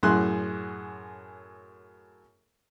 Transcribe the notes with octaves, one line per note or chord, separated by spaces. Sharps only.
F#2 A2 G#4 C6 F#6